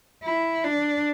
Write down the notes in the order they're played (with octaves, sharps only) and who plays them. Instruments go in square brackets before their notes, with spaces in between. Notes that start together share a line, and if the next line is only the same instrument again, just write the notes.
[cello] E4
D4